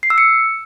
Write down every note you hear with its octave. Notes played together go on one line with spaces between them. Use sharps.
C7
E6
C#7